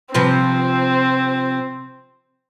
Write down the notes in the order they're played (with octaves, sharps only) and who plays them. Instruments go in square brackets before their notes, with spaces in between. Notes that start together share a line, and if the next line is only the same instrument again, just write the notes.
[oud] C3 F3 B4 [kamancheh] C4